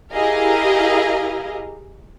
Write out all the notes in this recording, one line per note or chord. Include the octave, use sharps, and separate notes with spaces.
E4 G4 G#4 A#4 D#5 F5